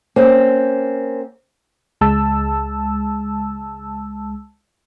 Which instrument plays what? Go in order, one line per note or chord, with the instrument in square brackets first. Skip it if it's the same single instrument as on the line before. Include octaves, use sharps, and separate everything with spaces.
[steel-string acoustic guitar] A#3 C4 C#4
[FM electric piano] C#2 G#3 A5 E6